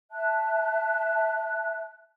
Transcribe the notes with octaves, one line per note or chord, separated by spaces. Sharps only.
E5 A5 F#6